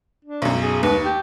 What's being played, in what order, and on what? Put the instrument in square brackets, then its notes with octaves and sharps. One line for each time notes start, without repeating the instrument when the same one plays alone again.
[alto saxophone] D4
[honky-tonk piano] B1 F#2
[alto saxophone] G#4
[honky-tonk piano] D#2 [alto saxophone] B4
[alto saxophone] G4